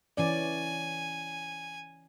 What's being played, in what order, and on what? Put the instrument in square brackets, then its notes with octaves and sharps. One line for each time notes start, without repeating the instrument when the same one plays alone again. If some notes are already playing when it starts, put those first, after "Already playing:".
[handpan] E3 C#4 D5 [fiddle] G#5